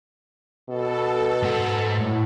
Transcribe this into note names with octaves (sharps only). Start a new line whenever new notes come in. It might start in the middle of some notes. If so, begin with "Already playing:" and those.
B2 A4
G#2 F#5
A2